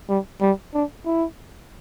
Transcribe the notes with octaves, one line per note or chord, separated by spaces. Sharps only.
G3
G3
D4
E4